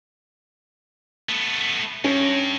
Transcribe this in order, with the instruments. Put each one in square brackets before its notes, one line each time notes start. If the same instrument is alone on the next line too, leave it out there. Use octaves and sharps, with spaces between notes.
[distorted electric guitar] A3 B3
[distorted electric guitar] G2 [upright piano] C#4